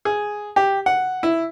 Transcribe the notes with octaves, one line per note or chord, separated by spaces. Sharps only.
G#4
G4
F#5
E4